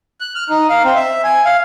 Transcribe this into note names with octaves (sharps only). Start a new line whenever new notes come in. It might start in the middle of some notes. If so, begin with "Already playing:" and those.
F#6
F6
D#4
F5
C4
E5
G#5
F5